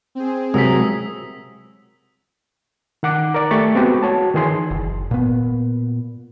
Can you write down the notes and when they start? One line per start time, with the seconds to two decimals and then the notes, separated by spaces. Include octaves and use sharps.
0.15 C4 G#4
0.54 C3 F#3 G#3 A#4 D#6 E6 B6
3.03 D#3 F#5 D6
3.34 A#4 D5
3.51 A3 G4 C#6 A6
3.75 G#3 B3 C4 F#4 G4
4.03 F#4 C#5 A5
4.34 D#3 E3 G#4 C6
4.71 F#1
5.11 A#2 B3